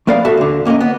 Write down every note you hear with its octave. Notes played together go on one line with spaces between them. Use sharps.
A3 B3 A#4 D5 F5
F#4 A4 E5
D2 D3
D2 A#3 C#4 A#4 D#5
B3